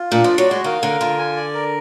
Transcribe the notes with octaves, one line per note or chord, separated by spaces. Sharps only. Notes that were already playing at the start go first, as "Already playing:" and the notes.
Already playing: F4
A#2 D4
F3
D5
F#3
G#3 F#4
D#3 F5
D3 A#4
D3 F4
G#5
D5
A#4